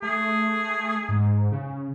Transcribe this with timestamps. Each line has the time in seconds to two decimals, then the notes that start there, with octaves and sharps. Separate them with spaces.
0.02 A3 G#4
1.09 G#2
1.52 C#3